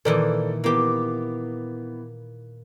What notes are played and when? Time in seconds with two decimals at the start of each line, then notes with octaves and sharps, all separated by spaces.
0.05 A#2 D#3 E3 A4 B4 D5
0.64 E3 A#3 B3 G4